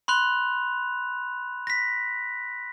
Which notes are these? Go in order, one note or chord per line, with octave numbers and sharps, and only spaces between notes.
B5 C6 F#6 F7
A#6 B6